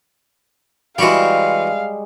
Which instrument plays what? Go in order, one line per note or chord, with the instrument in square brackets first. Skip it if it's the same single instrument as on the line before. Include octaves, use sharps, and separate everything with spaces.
[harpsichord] E3 F#4 G4 [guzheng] G3 G#3 [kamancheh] F5